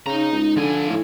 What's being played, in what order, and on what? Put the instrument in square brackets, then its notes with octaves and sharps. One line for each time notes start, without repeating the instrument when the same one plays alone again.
[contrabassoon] C#3 [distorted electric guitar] D#4 A#5
[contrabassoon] C#2
[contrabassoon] D3 [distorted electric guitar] F3 G#5
[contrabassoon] A2